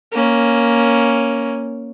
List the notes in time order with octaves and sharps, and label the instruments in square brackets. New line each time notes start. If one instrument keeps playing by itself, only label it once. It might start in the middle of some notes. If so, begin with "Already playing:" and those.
[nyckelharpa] A#3 C#4